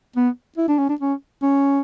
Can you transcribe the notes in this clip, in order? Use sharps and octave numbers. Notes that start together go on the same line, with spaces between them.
B3
E4
D4
C#4
D4
C#4
C#4